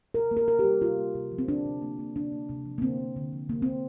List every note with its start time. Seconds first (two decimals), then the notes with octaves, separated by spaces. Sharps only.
0.14 C3 A#4
0.31 A#3
0.37 A#4
0.48 C3 A#4
0.59 G4
0.64 G3
0.81 C3 F4
0.98 A#3
1.15 C3
1.32 F3
1.39 C4
1.48 C3 D4
1.65 C3
1.82 A#3
1.99 A#3
2.16 C3 D4
2.32 A#3
2.49 C3
2.65 F3
2.78 A#3
2.82 D3 C4
2.99 A#3
3.16 D3
3.33 F3
3.49 C3 A#3
3.62 A#3 C4